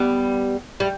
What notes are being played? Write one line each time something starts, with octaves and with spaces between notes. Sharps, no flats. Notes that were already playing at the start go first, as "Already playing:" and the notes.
Already playing: G3 B3
G3